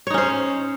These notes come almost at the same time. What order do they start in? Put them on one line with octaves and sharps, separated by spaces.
C#5 D#4 C#4 C5